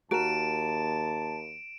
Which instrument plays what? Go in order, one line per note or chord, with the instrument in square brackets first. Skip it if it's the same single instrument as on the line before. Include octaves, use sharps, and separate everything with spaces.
[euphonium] D#2 [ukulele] F#4 A#4 [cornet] A5 [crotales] D7 E7